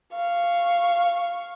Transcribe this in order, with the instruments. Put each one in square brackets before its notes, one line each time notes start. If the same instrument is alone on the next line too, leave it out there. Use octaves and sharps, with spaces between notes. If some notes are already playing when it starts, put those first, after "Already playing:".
[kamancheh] F5 C#6